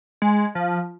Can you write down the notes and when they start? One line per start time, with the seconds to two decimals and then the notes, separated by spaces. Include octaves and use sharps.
0.22 G#3
0.55 F3